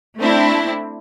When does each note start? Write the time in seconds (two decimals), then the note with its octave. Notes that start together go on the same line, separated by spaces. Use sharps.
0.17 A3 C4 D4 E4